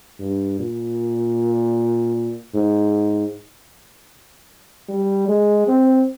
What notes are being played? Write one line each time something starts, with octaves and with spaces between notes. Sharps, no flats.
G2
A#2
G#2
G3
G#3
C4